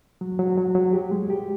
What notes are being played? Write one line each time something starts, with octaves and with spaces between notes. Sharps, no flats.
F#3
F#3
F#3
F#3
G4
G#3
G4